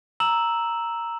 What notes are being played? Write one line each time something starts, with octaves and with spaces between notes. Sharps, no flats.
A#5 E6 E7 F#7